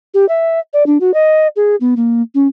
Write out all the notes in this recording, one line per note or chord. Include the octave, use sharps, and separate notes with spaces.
G4
E5
D5
D4
F#4
D#5
G#4
B3
A#3
C#4